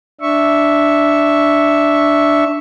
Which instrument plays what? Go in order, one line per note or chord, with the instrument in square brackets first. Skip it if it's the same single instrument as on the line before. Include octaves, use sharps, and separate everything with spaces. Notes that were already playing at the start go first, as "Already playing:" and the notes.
[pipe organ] D4 E5 C#6